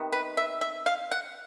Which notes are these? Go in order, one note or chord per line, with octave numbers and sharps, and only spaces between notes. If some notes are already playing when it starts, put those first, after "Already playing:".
Already playing: C3 D#3 B3
B4
E5
E5
F5
F#5